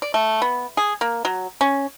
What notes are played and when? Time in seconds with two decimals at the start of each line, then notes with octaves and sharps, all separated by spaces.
0.02 D5
0.14 A3
0.42 B3
0.77 G#4
1.01 A#3
1.25 F#3
1.61 C#4